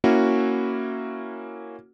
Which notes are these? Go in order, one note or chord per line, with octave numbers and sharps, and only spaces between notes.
A#3 C#4 E4 F#4